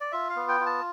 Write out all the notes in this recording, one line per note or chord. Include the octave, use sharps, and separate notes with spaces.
D5
F4 E5
F5
B3
G5
F4
A5